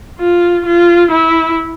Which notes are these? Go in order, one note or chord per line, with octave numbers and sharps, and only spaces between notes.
F4
F4
E4